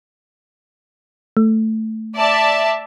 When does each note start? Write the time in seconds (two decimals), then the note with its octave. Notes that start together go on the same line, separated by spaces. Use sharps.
1.37 A3
2.16 D5 E5 A5